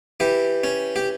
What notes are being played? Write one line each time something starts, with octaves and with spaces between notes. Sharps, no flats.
E3 G4
C#4
G4